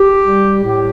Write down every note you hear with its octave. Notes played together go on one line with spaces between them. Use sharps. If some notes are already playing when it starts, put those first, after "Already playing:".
Already playing: G4
G3
A2 G4